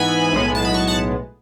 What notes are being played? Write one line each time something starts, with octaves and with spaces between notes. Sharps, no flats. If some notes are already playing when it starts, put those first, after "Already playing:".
Already playing: G#2 E3 B3 G#5 B5
B1 A2 G#3 B3
A5
B5
A5 C#6
F#5 A5